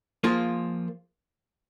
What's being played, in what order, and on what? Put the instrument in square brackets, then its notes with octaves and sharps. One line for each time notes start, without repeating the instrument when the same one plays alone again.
[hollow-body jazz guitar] F3 A#3 F4 G#4